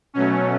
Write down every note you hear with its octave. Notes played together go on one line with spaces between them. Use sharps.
B2 F#3 A3 C#4